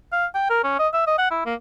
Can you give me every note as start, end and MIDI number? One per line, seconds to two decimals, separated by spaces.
0.12 0.26 77
0.34 0.45 79
0.50 0.62 70
0.64 0.74 61
0.79 0.88 75
0.93 1.02 76
1.07 1.15 75
1.18 1.29 78
1.31 1.44 64
1.46 1.54 58